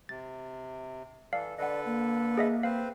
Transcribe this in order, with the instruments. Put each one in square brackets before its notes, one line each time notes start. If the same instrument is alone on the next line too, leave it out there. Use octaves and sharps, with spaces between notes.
[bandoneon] C3 [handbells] A6
[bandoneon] E3 A4 [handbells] D5 F5
[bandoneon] D3 A4 B4 [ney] D5 [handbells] D#5 F#5
[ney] A#3
[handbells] G#4 D#5 E5
[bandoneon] C4 B4 C5 [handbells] F5